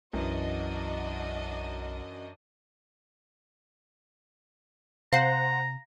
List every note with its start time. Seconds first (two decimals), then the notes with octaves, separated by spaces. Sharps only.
0.13 B1 F#2 E3 D4 F#4 D#5
5.13 C3 C5 F5 F#5 A#5 C7